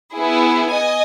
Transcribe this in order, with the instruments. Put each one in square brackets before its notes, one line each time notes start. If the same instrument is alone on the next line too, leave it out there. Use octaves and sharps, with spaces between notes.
[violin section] B3 E4 G#4
D#5 G#5